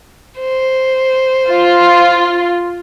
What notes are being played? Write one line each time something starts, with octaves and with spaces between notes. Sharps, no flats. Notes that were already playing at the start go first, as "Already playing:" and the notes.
C5
F4